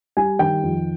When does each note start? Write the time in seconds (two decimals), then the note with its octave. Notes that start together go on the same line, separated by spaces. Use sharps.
0.17 G3 G#5
0.39 D#3 G5
0.63 F2